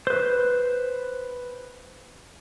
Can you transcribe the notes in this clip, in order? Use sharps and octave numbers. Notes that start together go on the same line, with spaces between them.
B4 C5